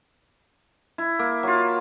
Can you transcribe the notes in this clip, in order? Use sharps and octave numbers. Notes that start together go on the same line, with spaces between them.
E4
A#3
F#3 F4